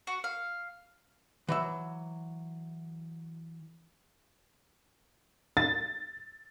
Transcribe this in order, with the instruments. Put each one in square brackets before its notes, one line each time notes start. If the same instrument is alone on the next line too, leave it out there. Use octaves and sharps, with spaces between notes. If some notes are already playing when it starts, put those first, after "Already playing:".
[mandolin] F#4
F5
[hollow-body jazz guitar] E3 F#3 E5
[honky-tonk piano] A6